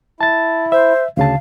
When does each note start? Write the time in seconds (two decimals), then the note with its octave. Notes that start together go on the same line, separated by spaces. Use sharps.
0.21 E4 A5 A6
0.72 C5 E5
1.17 D2 C#3 F5 A5